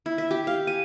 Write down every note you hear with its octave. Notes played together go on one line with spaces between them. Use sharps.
E4
E5
G4
F5
G#5